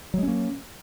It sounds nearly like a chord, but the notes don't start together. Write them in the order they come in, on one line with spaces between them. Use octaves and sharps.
F#3 G#3 C#4 A#3